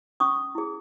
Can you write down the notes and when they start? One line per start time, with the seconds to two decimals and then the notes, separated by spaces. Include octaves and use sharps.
0.20 C#4 C#6 D#6
0.55 E4 G#4